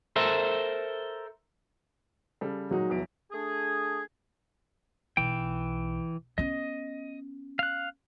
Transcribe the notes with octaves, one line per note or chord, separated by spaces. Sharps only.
A4 A#4 C5 E5
C#3 G3 A4
A#2 F#3 G#3 D#4
F1 E2 D7
A3 D4 G#4
B1 E3 G5
B3 C#4 D#5
F5 F#6